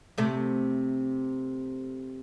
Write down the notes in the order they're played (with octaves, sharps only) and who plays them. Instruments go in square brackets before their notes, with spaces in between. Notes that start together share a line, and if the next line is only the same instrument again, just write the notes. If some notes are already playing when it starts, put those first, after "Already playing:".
[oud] C3 A3